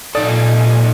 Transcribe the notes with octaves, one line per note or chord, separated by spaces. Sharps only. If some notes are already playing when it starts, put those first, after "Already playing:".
A#2 D#4 A4 D5 D#5 G#5 D#6 A6